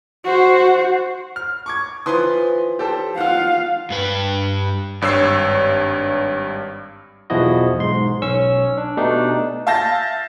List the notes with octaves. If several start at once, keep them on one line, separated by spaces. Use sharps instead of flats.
F#4 C5
F6
C#6 D6 G#6
E3 F3 B4 C6 D#6
G4 A4 C5
F4 F5 F#5
G2 B4
G#1 G2 C#5 E6 C7
B1 E2 F3 E4 F#4 D#5
B1 G#2 C6
B1 C#4 C#6 E6
D4
B2 A3 D4 D#4 G4
E5 F5 A5 G6 A6 A#6